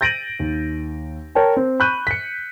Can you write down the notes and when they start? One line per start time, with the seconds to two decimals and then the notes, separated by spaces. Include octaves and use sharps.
0.01 G6 A6 A#6 D7 D#7 F#7
0.39 D#2
1.35 A#4 C#5 G5 A5
1.57 C4
1.80 B5 C#6 F#6 G6 D#7
2.07 B6 C#7